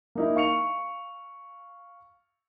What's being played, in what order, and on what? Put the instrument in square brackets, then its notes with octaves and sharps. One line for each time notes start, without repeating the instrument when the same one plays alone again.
[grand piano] A#3 D#4 E4
F5 C#6 C#7 F7